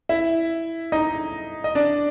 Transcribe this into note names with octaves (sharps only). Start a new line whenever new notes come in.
E4 E5
D#4 D#5
D#5
D4 D5